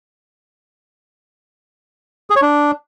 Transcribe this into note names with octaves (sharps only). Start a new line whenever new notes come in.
G#4
C#5
D4